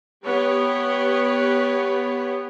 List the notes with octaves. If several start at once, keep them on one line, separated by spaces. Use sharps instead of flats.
B3 G4 C#5